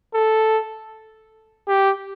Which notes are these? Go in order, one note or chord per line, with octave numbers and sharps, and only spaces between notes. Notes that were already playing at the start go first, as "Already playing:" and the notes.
A4
G4